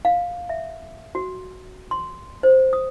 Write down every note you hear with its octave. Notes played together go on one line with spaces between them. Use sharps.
F5
E5
F#4
C6
C5
D#6